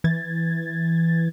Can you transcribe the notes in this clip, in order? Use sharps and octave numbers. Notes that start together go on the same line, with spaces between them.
E3 G#6 A6